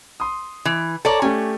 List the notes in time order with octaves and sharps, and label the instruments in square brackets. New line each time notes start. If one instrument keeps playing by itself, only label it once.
[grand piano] C6 D#6
[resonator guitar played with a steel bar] E3
[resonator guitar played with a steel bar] A4 D5 [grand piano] C#5 A5 A#5
[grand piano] A3 G4 [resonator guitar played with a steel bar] C#4